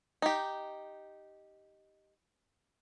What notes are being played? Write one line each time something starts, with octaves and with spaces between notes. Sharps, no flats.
D#4 G4